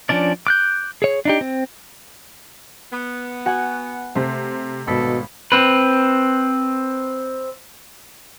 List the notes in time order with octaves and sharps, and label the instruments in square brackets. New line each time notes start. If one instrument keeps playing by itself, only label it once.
[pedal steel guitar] F3 C#4 D4 D5
D6 F#6 G6
G#4 C#5
D4 D#4 G4
C4
[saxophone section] B3
[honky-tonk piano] F#4 [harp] F#5 G#5
[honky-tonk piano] C3 C5 [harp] A3
[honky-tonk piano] G#1 [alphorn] B2 [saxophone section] D4 A4 D#5 [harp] B5 B6
[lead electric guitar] C4 B4